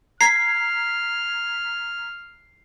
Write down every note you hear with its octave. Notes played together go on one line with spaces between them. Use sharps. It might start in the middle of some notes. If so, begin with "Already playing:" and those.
A#5 F6 G#6 B6 C7